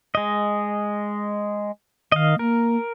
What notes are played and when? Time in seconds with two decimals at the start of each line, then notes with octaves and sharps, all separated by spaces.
0.15 G#3 D#5
2.12 D#3 D#5 F5
2.39 A#3 A#4